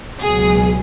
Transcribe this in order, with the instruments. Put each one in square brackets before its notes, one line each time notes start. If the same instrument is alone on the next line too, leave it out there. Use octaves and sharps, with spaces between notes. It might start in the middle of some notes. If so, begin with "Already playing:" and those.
[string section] C#2 B2 F#3 G#4